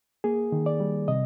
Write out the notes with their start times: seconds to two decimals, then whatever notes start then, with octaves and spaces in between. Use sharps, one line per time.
0.24 A#3 G#4
0.52 D#3
0.66 D5
0.80 G3
1.08 C3 D#5